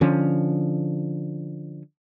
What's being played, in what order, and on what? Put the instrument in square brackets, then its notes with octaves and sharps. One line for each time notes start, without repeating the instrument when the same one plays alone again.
[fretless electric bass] D3 F3 C#4